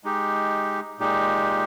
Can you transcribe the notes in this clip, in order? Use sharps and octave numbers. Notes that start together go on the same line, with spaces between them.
G#3 D#4 G4
A#2 G#3 D#4 G4